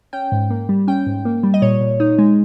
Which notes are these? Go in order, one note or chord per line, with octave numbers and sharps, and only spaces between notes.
C#4 G5
G#2
A#3
G3
C#4 G5
G#2
A#3
G3
D#5
A#2 C#5
A#2
D#4
G#3